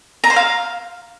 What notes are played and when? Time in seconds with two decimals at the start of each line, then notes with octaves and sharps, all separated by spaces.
0.24 A#5
0.30 C5
0.36 F5